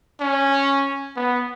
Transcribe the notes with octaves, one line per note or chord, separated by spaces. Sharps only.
C#4
B3